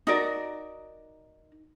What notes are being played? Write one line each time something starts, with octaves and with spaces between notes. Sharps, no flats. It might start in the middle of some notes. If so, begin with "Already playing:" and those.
D#4 F#4 A#4 D5